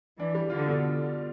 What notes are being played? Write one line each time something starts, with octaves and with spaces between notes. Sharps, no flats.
E3 D4
G3
D3 F4
B2